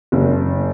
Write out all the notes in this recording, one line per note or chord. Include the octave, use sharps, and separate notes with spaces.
F#1